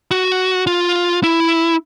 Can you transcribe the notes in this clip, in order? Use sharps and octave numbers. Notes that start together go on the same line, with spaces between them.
F#4
F4
E4